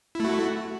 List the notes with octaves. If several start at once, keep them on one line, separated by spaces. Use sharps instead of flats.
A3 E4 F#4